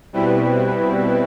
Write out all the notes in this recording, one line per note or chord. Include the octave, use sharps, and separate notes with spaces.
B2 G3 C4 E4 B4